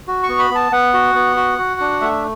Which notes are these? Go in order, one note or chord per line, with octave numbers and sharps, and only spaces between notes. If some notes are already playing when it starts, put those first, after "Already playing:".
F#4
C#6
B3
B5
B3 A5
B3 F#5
F#4
B3
F#4
F#4
D4
A3 E5